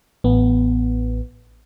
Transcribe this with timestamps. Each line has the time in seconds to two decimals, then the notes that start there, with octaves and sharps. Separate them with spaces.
0.24 A1 B3